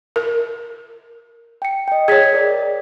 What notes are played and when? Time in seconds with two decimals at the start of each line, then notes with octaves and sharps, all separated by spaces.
0.16 A#4
1.62 G5 C#7
1.88 D#5 G5
2.08 G#4 C#5 G#6 B6
2.33 A#4 D5